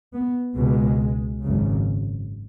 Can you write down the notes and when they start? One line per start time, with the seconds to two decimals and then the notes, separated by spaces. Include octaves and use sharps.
0.14 B3
0.56 C#2 B2 G#3
1.41 G#1 F#2 C#3